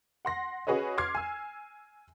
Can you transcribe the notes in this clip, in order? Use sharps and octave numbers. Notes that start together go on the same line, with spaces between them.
F#5 C6 A#6
C#4 F#4 G#4 B4 C#5 D#5
C6 D6 F6 G#6 C7
G#5 E6